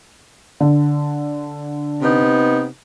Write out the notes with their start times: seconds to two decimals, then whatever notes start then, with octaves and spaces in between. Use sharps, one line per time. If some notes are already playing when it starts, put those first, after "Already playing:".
0.61 D3
2.02 C3 B3 D#4